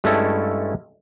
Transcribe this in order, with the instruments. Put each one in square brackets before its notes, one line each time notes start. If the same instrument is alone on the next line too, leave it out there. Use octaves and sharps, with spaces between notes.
[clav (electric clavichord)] G2 G#3 A3 C#4 E4 A4